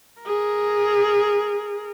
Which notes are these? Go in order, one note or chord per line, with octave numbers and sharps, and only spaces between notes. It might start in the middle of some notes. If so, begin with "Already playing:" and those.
G#4 A#4